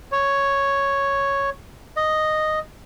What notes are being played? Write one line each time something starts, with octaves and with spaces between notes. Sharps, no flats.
C#5
D#5